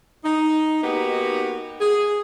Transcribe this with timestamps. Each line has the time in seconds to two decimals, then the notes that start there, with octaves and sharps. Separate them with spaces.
0.24 D#4
0.83 A#3 B3 D#4 F#4 G4 B4
1.80 G#4